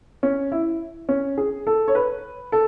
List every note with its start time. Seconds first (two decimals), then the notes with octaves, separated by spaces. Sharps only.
0.23 C#4
0.52 E4
1.09 C#4
1.38 G#4
1.67 A4
1.88 C#5
1.95 B4
2.52 A4